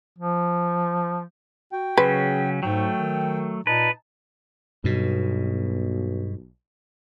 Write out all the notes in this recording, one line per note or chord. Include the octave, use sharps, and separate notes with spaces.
F3
F#4 G5
C#3 F#3 C#4 G#4 B4
G#2 F#3 A3 G5
D#3
A#2 D#4 B4 A5
B1 G2 B2